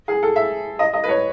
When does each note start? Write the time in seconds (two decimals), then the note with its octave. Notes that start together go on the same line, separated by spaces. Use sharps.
0.08 G#4
0.23 A4
0.36 E5
0.79 D#5
0.93 D#5
1.04 B4
1.08 C#5